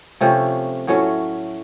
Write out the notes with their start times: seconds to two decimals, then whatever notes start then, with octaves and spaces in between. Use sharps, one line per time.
0.21 C3 F3 A3 C#4
0.87 A2 F#3 A3 C#4